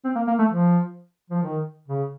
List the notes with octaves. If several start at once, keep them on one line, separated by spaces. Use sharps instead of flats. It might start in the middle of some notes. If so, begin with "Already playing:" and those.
C4
A#3
A#3
A3
F3
F3
D#3
C#3